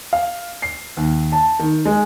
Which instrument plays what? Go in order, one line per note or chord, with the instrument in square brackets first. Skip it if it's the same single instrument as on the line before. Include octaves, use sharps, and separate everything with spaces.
[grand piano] F5
C7
D#2
A5
D#3
G#3